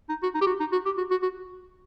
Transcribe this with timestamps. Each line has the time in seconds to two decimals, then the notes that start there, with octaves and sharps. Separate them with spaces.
0.09 D#4
0.23 F#4
0.34 D#4
0.41 G4
0.47 F#4
0.60 D#4
0.72 F#4
0.85 G4
0.98 F#4
1.11 F#4
1.23 F#4